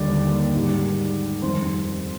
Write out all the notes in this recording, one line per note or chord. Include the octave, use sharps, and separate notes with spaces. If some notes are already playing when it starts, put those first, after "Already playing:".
Already playing: D#2 D3 G3 D5
G#2 G3
F2 D#3 G3 C5 C6